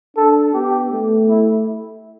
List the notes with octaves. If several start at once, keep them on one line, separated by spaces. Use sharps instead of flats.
D4 A4
B3 G4
A3
E4